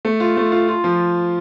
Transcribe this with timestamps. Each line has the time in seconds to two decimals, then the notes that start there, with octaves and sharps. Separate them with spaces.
0.05 A3
0.20 F4
0.37 A3
0.52 F4
0.68 F4
0.84 F3